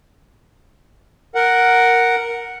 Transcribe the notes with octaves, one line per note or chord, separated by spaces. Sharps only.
A#4 F#5